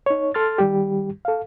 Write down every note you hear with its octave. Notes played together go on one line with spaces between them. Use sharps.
D#4 C#5
A4 C6 F6 A6
D#3 G3 G4
A4 F5